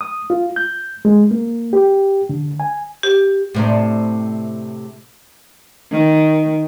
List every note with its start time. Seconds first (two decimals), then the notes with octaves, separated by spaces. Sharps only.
0.01 D#6
0.30 F4
0.56 G6
1.05 G#3
1.31 A#3
1.73 G4
2.29 D3
2.60 G#5
3.03 G4
3.54 A2 C3 D4
5.91 D#3